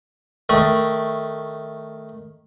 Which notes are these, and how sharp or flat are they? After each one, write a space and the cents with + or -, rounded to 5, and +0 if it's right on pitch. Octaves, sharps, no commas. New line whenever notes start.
D#3 +0 A3 +0 B5 -35